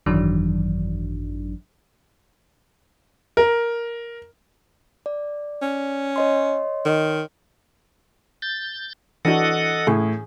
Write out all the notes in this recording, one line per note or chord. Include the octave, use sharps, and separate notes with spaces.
G#1 F#2 D#3 E3 F#3 D4
A#4
D5
C#4
C#5 D#5 C6
D#3
G6 A6
E3 D4 F#4 A4 D#5 F#5
A2 G#4